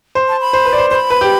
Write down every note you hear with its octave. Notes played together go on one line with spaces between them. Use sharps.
C5
A5
B5
C5
B4
D5
C5
C5 C6
B5
B4
G4